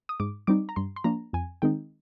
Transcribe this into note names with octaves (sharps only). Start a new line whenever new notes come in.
D#6
G#2 D6
G3 C4 D#4 D6
A#5
G2 C6
C6
F3 A#3 D4 A#5
F2 G#5
D#3 G#3 C4 D#4 G5